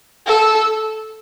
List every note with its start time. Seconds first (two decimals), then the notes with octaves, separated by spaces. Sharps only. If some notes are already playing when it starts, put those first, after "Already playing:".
0.27 A4